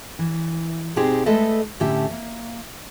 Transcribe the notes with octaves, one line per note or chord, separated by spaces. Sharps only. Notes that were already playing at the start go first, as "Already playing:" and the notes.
E3
B2 C4 D#4 G4 G#4 C5
G#3 A3 A4 B4 D#5 E5
A2 D3 C#4 G4 E5
A#3